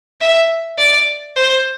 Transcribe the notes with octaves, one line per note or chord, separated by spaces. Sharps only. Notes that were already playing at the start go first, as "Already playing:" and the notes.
E5
D5
C5